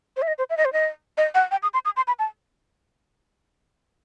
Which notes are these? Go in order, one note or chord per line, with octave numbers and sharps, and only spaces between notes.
C5
E5
D#5
C5
E5
D#5
C5
D#5
D#5
F#5
G5
D#6
C6
D#6
C6
B5
A5